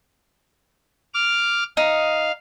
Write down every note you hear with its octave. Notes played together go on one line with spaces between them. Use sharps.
D6 F6
D#4 F5